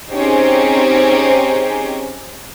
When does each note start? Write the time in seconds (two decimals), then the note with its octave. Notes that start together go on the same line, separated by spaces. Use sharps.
0.11 C4 C#4 D#4 G4 G#4 C5